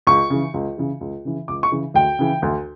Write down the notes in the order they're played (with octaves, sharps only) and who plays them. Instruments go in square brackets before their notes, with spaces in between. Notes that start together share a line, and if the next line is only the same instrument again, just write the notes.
[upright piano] C#2 C#6
C#3 E3
C#2
C#3 E3
C#2
C#3 E3
C#2 D6
C#6
C#3 E3
D2 G5
C#3 E3
D2